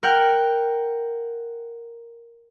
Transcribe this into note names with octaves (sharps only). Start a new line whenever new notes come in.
A#4 F#5 G5 F6